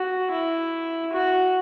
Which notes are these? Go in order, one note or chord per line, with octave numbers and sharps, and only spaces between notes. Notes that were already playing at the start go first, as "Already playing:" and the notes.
Already playing: F#4
E4
F#4